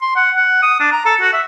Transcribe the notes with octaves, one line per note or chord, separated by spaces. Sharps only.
C6
F#5
F#5
D#6
D4
A#5
A4
F#4
E5